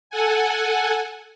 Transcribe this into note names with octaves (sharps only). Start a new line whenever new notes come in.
A4 F#5 G#5